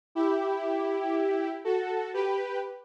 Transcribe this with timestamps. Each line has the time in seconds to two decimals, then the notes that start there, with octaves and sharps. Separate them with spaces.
0.15 E4 G4
1.64 F#4 A4
2.14 G4 B4